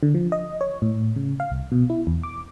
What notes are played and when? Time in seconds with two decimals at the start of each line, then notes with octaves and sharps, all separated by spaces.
0.03 D3
0.15 F3
0.32 D#5
0.61 C#5
0.82 A2
1.16 C#3
1.40 F5
1.51 C2
1.72 B2
1.90 E4
2.07 E2
2.23 D6